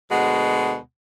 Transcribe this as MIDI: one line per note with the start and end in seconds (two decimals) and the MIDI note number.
0.11 0.78 38
0.11 0.78 47
0.11 0.78 56
0.11 0.78 78